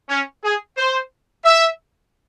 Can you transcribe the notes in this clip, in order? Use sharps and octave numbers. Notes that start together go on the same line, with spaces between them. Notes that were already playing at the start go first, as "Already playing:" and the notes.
C#4
G#4
C5
E5